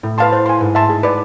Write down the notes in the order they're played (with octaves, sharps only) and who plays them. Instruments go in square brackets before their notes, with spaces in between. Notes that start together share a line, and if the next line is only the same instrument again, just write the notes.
[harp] A2 [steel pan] E4
[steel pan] B4 F5 A5 C6
C5
G#5 C6
[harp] G#2 [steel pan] B4
[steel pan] E5 A5 C6
G#4
B4 D5